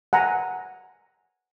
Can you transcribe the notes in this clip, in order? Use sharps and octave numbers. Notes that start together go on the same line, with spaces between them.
F#5 G#5 A#5